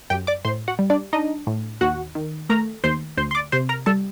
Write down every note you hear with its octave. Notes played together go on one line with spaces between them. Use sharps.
F#2 G4 G5
D5 D6
A2 C5 C6
F#4 F#5
G3
D4 D5
D4 D#4 D#5
A2
D#2 F#4 F#5
D#3
A3 A#4 A#5
D#2 C5 C6
D2 C5 C6
C6
D5 D6
C3 C5 C6
A#4 A#5
G3 A4 A5